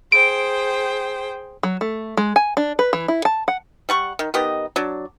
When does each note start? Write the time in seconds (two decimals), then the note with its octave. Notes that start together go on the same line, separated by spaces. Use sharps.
0.12 G#4 C5 G5 D7
1.63 F#3
1.81 A3
2.17 G#3
2.36 G#5
2.57 D4
2.79 B4
2.93 E3
3.08 E4
3.25 A5
3.48 F#5
3.89 G3 F#5 C#6
4.19 D#3
4.34 D#3 B3 G4 D#5
4.76 F#3 D4